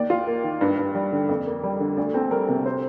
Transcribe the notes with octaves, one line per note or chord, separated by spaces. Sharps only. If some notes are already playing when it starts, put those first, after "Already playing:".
Already playing: D#2 D5
F4
A#3
D#3
G2
G2
G3
D3
F2
A#3
G3
D3
D2 D5
C4 A4
G3 A#4
C3 A#4
C5